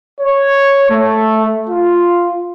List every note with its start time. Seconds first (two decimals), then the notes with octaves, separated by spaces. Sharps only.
0.21 C#5
0.91 A3
1.69 F4